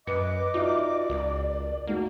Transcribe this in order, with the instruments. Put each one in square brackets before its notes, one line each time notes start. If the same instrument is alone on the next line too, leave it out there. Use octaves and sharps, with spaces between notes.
[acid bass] F#2 [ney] B4 [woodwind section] D#5 D6 [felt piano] C#7
[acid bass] D#4 [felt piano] F4 F#4 E5 [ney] D5
[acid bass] C#2 [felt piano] A#4
[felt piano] A3 D#4 F#4 [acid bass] A#3